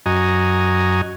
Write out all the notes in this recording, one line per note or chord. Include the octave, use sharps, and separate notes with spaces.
F#2 F#4 D#5 G#5 A#5